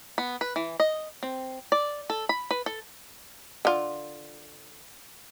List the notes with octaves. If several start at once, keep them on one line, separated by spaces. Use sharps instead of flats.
B3
B4
E3
D#5
C4
D5
A4
B5
B4
A4
D3 F4